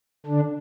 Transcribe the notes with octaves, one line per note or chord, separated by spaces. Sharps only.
D3 D4